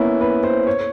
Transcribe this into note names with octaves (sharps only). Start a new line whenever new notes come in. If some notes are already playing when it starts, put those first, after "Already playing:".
Already playing: A#3 B3 C#4 E4
B4
C5
C#5